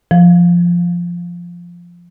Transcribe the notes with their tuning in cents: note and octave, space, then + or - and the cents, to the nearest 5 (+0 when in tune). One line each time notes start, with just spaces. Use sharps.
F3 -5